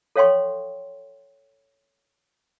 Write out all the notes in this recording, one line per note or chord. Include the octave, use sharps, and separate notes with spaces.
A4 C#5 F5 G5 C6 C#6